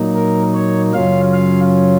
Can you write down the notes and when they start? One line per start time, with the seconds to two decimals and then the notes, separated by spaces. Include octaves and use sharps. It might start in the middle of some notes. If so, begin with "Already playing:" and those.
Already playing: A#2 F#3 A#3 D#4
0.15 A#4
0.54 C#5
0.94 F#2 C#3 F#3 C#4 F4 F5
1.33 F5